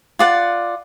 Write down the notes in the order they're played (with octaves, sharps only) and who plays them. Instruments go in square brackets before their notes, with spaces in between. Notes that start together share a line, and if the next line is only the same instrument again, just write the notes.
[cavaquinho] F4 D5 F#5